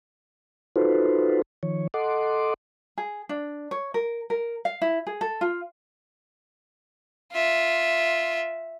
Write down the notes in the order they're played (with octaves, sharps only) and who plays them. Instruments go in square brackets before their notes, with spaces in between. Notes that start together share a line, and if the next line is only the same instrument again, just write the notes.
[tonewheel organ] D#4 F4 F#4 A4 B4 C5
D#3 F3 C#5
A4 D#5 F#5 C6 D6
[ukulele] G#4
D4
C#5
A#4
A#4
F5
E4
G#4
A4
F4
[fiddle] F4 E5